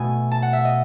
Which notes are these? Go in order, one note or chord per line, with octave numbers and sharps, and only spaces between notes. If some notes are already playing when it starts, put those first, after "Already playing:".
Already playing: B2 A3 G#5
A5
F#5
E5
D#5